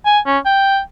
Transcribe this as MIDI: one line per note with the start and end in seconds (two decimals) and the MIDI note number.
0.06 0.19 80
0.27 0.38 61
0.46 0.80 79